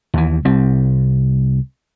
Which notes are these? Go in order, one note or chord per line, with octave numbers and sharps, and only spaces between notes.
D#2 E3
C2 G3 C4